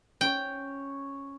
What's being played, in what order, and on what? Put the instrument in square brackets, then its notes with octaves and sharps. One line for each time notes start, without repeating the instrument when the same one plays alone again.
[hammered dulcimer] C#4 C#5 [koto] G5